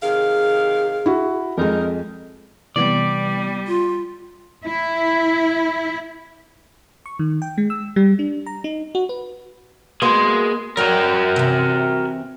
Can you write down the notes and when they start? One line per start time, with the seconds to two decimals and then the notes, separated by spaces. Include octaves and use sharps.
0.02 C3 D#3 G#4 F5
1.06 E4 F#4
1.58 F2 D3 G#3 D#4 A#4
2.76 C3 E3 G3 B3 D5
3.67 F4
4.66 E4
7.06 C#6
7.19 D#3
7.42 G5
7.58 G#3
7.70 E6
7.96 G3
8.19 D4
8.46 A#5
8.64 D#4
8.95 F#4
9.09 B4
10.02 A#3 B3 F#4 G#4 C6
10.77 F#3 G3 F#4 A#4
11.36 C3 E3